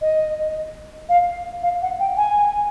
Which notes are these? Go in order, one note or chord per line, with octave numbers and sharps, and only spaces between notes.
D#5
F5
F5
F#5
G5
G#5